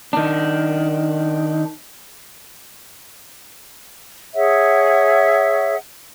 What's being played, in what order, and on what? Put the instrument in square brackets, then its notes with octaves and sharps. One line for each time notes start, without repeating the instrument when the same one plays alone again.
[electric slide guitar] D#3 D4
[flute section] G#4 C#5 E5 F#5